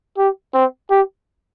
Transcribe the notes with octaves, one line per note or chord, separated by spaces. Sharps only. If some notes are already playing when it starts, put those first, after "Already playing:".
G4
C4
G4